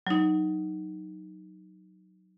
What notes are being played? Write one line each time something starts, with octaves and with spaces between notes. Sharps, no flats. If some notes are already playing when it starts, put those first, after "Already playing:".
F#3 D#4